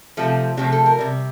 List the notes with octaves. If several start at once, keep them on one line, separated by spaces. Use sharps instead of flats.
C3 F3 A3
C3 F3 A3 G4
A4
A#4
C3 G3